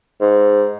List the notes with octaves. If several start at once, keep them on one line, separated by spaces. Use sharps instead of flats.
G#2